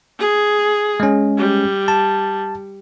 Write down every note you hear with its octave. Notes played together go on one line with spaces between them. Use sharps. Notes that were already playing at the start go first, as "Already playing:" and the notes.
G#4
G#3 C#4
G3
A5